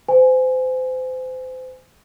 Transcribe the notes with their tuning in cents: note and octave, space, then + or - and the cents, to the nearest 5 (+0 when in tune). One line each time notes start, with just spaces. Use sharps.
C5 -30 G#5 +0